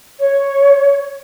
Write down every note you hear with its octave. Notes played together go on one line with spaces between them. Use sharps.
C#5